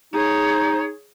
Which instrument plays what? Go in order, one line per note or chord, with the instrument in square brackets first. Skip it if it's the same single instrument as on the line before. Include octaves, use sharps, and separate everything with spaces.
[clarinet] D#4 [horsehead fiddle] G#4 C#5